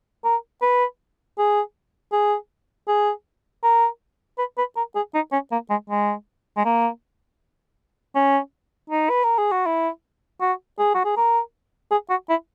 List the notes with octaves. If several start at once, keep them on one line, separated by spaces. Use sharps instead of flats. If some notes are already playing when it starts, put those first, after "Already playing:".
A#4
B4
G#4
G#4
G#4
A#4
B4
B4
A#4
G#4
D#4
C#4
A#3
G#3
G#3
G#3
A#3
C#4
D#4
B4
A#4
G#4
F#4
E4
F#4
G#4
F#4
G#4
A#4
G#4
F#4
E4